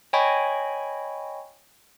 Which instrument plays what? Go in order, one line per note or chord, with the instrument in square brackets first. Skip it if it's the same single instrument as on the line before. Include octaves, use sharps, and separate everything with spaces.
[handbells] C#5 D#5 G5 G#5 B5 C#6